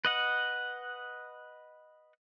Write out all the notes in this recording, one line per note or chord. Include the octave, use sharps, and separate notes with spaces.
B4 D#5 F#5